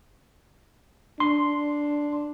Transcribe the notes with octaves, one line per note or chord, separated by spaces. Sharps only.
D4 C6